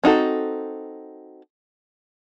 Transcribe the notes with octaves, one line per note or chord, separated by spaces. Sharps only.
C4 D#4 F#4 A4